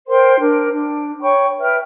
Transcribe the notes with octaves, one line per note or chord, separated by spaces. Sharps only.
A#4 C5 G5 C6
D4 A#4
D4
C#5 G5 B5 C#6
B4 E5 G5 F6